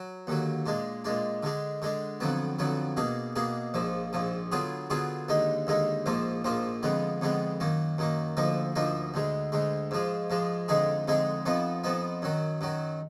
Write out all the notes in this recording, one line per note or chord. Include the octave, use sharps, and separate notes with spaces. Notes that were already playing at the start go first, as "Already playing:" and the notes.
Already playing: F#3
D#2 D3 F#3
A#2 G#3 D4
A#2 G#3 D4
D3 G#3 D4
D3 G#3 D4
F2 D3 F#3 B3
F2 D3 F#3 B3
B2 A#3 D4 G#4
B2 A#3 D4 G#4
A#1 G#2 F3
A#1 G#2 F3
D3 F#3 B3 F4 G#4
D3 F#3 B3 F4 G#4
D#2 D3 G#3 D#4
D#2 D3 G#3 D#4
A#1 G#2 F3 A#3 F4
A#1 G#2 F3 A#3 F4
F2 D3 G#3 B3
F2 D3 G#3 B3
F#2 D#3 A#3
F#2 D#3 A#3
D2 D3 F3 A#3 D#4
D2 D3 F3 A#3 D#4
D2 D3 G#3
D2 D3 G#3
G#2 F3 G#3
G#2 F3 G#3
F2 D3 G#3 D#4 G#4
F2 D3 G#3 D#4 G#4
F2 F3 B3 D#4
F2 F3 B3 D#4
F#2 D#3 F#3
F#2 D#3 F#3